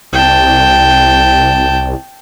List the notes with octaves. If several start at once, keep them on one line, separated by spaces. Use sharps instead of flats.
C2 G5 A5